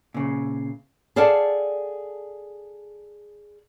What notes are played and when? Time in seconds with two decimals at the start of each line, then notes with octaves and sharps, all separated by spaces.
0.14 A#2 C#3
1.16 G#4 A4 D5 F5 F#5 A5